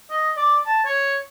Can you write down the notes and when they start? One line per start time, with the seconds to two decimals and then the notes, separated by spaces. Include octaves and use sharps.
0.11 D#5
0.37 D5
0.66 A5
0.85 C#5